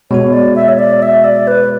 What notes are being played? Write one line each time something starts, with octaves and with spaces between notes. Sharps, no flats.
B2 G#3 B3 F#4 C#5
D5
E5
C#5
D5
E5
D5
B4